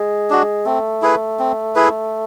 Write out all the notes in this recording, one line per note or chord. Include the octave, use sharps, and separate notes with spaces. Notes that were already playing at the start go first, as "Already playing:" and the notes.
Already playing: G#3
D4 F#4
A3 C4
E4 G#4 B4
C4
E4 G#4 B4